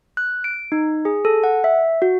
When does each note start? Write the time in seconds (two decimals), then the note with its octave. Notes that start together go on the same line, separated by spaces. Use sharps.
0.17 F#6
0.44 D7
0.72 D#4
1.05 G#4
1.25 A4
1.44 F#5
1.64 E5
2.02 F#4